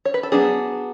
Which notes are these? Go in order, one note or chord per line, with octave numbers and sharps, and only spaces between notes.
C#5
B4
A4
F#3 B3 D4 G#4